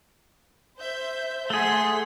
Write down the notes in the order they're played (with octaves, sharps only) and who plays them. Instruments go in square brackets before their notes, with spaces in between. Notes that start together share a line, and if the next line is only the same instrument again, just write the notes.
[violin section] C5 E5 G6
[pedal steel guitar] A3 G#4 [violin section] F#5 C6 B6